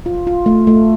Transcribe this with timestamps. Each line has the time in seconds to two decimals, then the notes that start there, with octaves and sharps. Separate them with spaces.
0.06 F4
0.27 F4
0.46 A3
0.67 A3